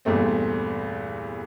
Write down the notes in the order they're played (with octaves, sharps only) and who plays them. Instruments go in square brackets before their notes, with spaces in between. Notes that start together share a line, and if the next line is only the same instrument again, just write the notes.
[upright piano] E2 G2 A#2 A3 C4